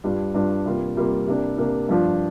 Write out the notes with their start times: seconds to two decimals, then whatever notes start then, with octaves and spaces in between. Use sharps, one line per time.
0.04 G2 G3 D4 F4
0.34 G2 G3 D4 F4
0.66 C3 G3 A#3 F4
0.97 C3 G3 A#3 F4
1.28 C3 A#3 D4
1.58 C3 A#3 D4
1.89 G2 F3 D4 F4